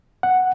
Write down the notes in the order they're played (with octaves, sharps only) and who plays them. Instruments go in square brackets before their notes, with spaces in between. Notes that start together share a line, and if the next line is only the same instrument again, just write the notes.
[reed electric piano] F#5